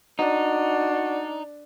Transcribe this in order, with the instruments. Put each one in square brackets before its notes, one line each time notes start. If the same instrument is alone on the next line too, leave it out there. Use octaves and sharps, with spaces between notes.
[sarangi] D4 [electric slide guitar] D#4 [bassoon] F#4